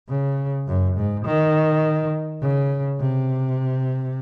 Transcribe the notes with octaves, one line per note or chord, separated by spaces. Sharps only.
C#3
F#2
G#2
D#3
C#3
C3